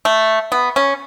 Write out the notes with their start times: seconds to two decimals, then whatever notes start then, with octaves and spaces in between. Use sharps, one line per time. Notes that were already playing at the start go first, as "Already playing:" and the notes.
0.05 A3
0.52 B3
0.76 C#4